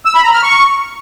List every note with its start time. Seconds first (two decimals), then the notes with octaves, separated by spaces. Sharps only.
0.05 E6
0.15 B5
0.24 A#5
0.34 F6
0.43 C#6